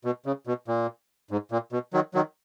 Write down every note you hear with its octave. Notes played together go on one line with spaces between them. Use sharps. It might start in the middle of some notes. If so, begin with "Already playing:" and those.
B2
C#3
B2
A#2
G#2
A#2
B2
D#3 F#3
D#3 F#3